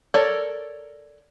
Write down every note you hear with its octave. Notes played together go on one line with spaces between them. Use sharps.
A4 A#4 C#5 D5